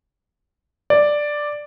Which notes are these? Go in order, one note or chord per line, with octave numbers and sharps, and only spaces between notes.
D5